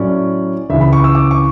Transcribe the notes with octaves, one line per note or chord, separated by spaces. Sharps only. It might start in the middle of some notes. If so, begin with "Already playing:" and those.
Already playing: A2 F#3 C#4 D5
C#2 C#3 E3 E5
B5
C#6
E6
D6
C#6